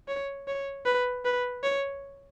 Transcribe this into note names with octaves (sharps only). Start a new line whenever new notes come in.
C#5
C#5
B4
B4
C#5